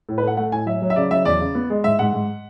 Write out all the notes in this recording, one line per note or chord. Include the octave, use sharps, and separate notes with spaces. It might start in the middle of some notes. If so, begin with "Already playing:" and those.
A2
B4
A3 F#5
A3 F#5
A2 G#5
F#3 E5
F#3
E5
C#3 D5
F#3 E5
E2 D5
C#3
B3
G#3
G#2 E5
G#2 F#5
G#2